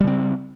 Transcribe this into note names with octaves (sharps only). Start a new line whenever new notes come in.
C#3 G3 C4